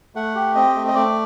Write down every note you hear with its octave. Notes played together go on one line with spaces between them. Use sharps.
A3 F#5
G4
C4 D#5
A3
D#5
A3 D5